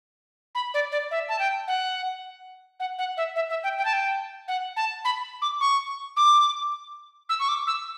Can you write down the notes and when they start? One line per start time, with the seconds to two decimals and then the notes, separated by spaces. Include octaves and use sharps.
0.55 B5
0.74 D5
0.92 D5
1.11 E5
1.29 A5
1.39 G5
1.68 F#5
2.80 F#5
2.99 F#5
3.17 E5
3.36 E5
3.50 E5
3.64 G5
3.78 G5
3.85 A5
3.93 G5
4.48 F#5
4.76 A5
5.05 B5
5.42 D6
5.61 C#6
6.17 D6
7.29 E6
7.40 C#6
7.49 D6
7.67 E6